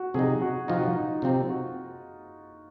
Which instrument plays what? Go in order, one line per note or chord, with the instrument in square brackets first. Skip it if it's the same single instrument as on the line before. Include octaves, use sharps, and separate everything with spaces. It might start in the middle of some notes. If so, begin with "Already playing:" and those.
Already playing: [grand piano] F#4
[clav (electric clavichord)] C3 F3 C4 D#4 [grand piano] G#4
[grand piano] F#4
[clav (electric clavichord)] C3 F3 C4 D#4 [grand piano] F4
[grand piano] F#4
F4
D#4
[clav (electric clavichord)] C3 F3 C4 D#4 [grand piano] F4
[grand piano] F#4